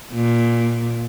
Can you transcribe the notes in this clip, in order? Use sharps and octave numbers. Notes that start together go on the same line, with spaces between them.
A#2